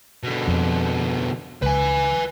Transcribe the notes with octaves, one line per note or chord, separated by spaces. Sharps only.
B2 D3
F2
C#2 B4 G#5